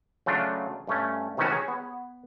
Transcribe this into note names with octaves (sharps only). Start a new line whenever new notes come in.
C#3 F#3 A3 D4 F4
G2 A3 C#4
C3 D#3 E3 A3 C#4 F#4
G#4 C#5
B3